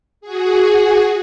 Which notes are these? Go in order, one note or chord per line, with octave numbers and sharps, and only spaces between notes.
F#4 G#4